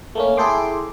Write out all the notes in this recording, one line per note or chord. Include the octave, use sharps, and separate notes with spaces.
A3 A#3 C#4
E4 G#4 A4 G5 C6 D6